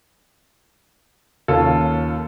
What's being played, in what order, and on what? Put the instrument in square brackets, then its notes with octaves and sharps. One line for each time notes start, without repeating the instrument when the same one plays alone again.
[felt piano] D#2 [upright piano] C#4 F4 A4